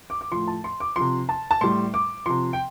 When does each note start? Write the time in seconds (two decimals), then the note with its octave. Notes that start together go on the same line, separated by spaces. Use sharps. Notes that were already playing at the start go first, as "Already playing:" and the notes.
0.10 D6
0.21 D6
0.31 A2 F3 C6
0.48 A5
0.64 C6
0.80 D6
0.96 C3 F3 C6
1.29 A5
1.51 A5
1.61 A2 G3 C6
1.94 D6
2.26 C3 F3 C6
2.53 G5